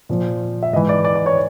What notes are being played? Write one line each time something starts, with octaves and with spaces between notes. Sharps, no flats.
A#2 F3
E5
G#2 E3 D#5
D5
D5
D5
C#5